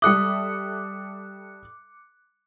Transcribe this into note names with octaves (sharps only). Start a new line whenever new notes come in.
G3 A4 E5 D6 D#6 F#6 C#7